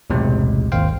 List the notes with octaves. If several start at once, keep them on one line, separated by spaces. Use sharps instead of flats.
B1 E2 A2 C3 F#3 G#3
G#1 D#2 C5 F5 G5